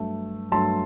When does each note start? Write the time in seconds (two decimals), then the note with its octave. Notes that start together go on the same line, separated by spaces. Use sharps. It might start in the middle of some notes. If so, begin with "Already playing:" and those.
Already playing: G2 F#3 A3
0.51 G2 F#3 A3 A5 C6